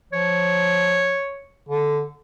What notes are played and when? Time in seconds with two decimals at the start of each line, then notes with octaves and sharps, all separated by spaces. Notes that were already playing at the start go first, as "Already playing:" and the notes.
0.13 F3 C#5
1.69 D3